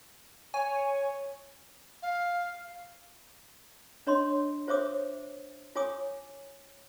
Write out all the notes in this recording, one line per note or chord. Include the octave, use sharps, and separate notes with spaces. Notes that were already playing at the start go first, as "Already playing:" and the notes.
C#5 G#5
F5
D4 C#5 D#5 C6
F4 C5 C#5 E5 D6 D#6
F4 C#5 G#5 D6 D#6